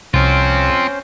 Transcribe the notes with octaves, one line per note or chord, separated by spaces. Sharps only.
C2 C4 C#4 F4 C5